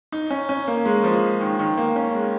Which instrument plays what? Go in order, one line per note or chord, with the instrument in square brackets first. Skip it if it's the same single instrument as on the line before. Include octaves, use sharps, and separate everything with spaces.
[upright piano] D#4
C#4
C#4
A#3
G#3
F3
D#3
D#3
A#3
C#4
G#3